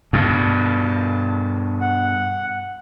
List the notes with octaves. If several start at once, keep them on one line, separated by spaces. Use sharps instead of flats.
G2 B2 A5
F#5